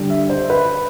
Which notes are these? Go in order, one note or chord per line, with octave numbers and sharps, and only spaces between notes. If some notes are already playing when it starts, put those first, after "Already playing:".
Already playing: D3 G3 D4
E5
C5
B4